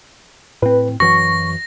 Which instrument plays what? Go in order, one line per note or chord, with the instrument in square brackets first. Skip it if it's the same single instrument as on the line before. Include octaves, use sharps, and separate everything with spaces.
[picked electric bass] A2 C4 [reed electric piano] B4
[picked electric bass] F#2 E3 F#3 [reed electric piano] C#6 [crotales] A#6